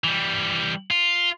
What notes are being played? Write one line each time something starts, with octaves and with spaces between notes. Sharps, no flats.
E3 G3
F4